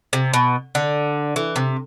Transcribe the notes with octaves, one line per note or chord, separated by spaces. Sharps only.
C3
B2
D3
E3
C3